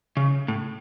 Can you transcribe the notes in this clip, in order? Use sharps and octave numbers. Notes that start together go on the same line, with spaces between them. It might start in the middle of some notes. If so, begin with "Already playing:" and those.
C#3
A2